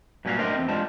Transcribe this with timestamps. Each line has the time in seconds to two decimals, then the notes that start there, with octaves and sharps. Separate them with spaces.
0.25 G2 A#2 F#3 C#4 F#4 F5
0.38 A3 D4 A#4 C5 D#5 G5
0.56 E2 C4
0.69 G3 G#3 D4 F4 A5